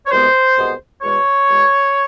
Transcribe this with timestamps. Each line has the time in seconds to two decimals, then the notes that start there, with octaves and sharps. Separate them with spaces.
0.07 C#5
0.11 C2 B2 G#3 B3 C5
0.56 C2 B2 G#3 B3
1.02 E2 B2 G#3 C#5
1.47 E2 B2 G#3